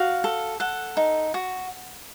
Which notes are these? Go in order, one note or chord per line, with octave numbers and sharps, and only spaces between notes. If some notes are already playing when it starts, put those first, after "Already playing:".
Already playing: F#4 F5
A4
A4 F#5
D#4
F#4